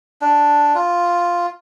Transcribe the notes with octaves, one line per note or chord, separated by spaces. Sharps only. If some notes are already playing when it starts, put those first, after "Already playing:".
D4
F4